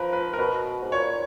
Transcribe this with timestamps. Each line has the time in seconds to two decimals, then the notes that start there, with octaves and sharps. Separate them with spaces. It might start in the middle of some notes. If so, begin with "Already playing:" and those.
Already playing: F3 A#4 B4
0.13 B4
0.33 A#4
0.39 B2 B4
0.83 G#2
0.92 A#2 C#5